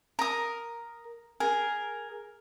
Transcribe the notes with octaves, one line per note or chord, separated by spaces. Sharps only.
A#4 D#6
G#4 A#4